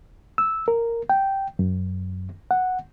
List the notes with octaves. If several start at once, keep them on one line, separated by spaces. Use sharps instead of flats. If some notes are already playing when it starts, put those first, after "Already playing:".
E6
A#4
G5
F#2
F#5